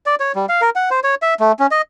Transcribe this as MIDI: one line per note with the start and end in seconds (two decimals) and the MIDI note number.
0.06 0.15 74
0.20 0.32 73
0.35 0.46 55
0.49 0.61 77
0.61 0.70 70
0.76 0.89 78
0.91 1.00 72
1.04 1.15 73
1.22 1.34 76
1.40 1.52 57
1.59 1.67 61
1.71 1.82 75